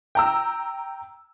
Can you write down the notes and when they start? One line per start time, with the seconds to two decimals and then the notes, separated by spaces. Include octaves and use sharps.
0.15 G5 A#5 E6